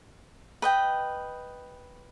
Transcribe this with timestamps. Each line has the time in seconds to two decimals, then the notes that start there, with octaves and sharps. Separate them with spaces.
0.62 B4 D#5 G5